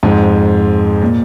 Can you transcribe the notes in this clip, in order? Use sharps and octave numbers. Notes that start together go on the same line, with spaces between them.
F2 G#2
A#2